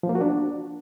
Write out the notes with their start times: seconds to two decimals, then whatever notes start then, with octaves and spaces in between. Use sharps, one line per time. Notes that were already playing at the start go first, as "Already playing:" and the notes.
0.03 F3
0.09 A#3
0.15 F#4
0.21 D4